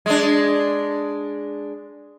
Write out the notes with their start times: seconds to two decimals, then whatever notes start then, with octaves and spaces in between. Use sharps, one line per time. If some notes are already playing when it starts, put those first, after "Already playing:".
0.06 G#3 D4